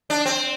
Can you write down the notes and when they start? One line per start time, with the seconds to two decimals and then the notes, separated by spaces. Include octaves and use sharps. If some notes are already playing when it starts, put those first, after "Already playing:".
0.10 D4
0.26 C4